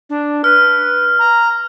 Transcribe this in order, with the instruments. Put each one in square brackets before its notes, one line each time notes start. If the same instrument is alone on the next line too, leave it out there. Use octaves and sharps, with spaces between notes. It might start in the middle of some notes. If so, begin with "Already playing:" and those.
[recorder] D4
[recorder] B4 [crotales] F6
[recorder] A#5